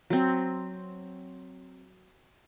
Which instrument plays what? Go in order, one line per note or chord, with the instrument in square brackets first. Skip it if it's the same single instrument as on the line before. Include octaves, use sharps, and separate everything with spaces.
[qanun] F#3 C4